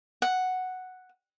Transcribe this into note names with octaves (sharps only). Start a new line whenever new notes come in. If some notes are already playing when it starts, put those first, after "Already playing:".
F#5